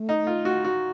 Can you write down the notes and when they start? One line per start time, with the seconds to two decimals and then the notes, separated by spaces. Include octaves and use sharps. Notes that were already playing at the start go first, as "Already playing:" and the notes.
Already playing: A3
0.09 D#4
0.27 F4
0.45 F#4
0.64 F#4